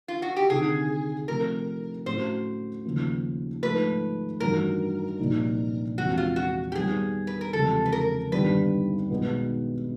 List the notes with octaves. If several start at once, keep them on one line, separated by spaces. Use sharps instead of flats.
F4
F#4
G4
D2 C3 D#3 G#4
C3 F3 A3 C4 A#4
A2 F#3 A3 C#4 F#4 C5
D#2 C#3 F3 A#3
G#2 F3 A3 B4
A1 G2 D#3 F#3 A#4
C2 A#2 F3 A#3 D#4
E2 C3 F3 G#3 C4 F#4
F4
F#4
G4
D#3 G3 B3 G#4
B4
A#4
F#1 E2 C3 F3 G#3 A4
B4
A#4
G#1 G2 D3 G3 B3 B4
B1 B2 G#3 B3